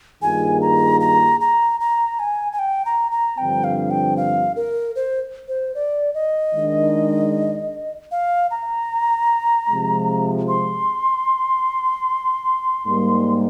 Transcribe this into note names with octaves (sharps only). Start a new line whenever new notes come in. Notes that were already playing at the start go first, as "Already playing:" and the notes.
G2 D#3 A#3 F4 G#4 G#5
A#5
A#5
A#5
A#5
G#5
G#5
G5
A#5
A#5
G2 D3 F3 C4 G5
F5
G5
F5
A#4
C5
C5
D5
D#5
D#3 G#3 D4
F5
A#5
C3 F3 G#3
C6
G#2 G3 A#3